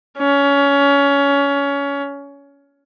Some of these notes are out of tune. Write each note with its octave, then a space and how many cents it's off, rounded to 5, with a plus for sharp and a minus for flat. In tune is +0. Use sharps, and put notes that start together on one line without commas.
C#4 +25